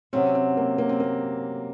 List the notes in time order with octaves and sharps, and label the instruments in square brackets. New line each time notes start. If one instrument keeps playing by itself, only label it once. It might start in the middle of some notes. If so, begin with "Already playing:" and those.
[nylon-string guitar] C3 F#3 C#4 [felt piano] C4
[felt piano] C4
A#3
A#3
C4
A#3